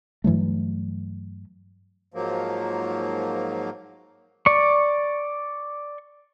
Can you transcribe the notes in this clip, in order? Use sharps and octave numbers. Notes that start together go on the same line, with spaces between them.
G2 E3 F#3 A3
G#2 F3 F#3 A#3
D5 C#6